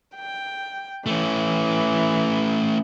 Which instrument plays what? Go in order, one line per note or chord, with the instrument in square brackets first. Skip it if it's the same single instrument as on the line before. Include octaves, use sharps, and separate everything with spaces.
[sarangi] G5
[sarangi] E3 [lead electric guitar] A3 C#4